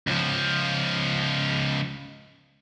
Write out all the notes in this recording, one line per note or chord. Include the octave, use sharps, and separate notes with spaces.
C#2 F3